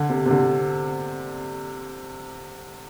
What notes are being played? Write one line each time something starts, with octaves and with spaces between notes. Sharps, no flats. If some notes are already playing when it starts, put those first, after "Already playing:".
Already playing: D3
C3
C3
D3